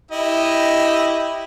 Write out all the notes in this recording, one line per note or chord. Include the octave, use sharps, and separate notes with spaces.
E4 G4 D#5